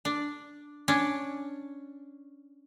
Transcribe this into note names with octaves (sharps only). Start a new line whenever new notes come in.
D4
C#4 D4